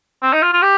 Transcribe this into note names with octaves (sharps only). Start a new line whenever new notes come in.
C4
D#4
F4
F4
G4